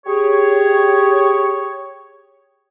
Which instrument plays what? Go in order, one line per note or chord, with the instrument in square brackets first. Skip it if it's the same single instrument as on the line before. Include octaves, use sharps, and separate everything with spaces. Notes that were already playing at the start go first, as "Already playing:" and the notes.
[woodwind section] G4 G#4 C#5